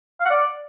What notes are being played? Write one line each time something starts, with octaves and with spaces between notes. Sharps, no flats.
F5
F#5
D5